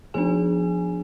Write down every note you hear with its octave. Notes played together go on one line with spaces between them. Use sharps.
F3 B3 D4 G#4 G#5